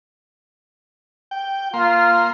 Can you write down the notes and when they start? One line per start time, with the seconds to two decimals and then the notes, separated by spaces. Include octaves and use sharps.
1.31 G5
1.74 A#3 F4 C6